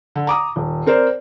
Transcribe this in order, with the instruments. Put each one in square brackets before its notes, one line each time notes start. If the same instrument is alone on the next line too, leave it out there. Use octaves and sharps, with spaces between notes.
[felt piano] D3
A#5 D6 D#6
D#1
C4 A#4 C5 D5